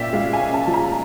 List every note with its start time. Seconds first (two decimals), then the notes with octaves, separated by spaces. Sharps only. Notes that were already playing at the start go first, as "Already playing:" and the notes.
Already playing: A#2 F3 C#4 D5 E5 F5 G5
0.13 G#3 F5
0.33 G#5
0.40 C#4
0.54 A5
0.67 F3
0.74 A#5